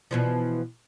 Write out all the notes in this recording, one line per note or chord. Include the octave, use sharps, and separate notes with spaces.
B2 E3 F3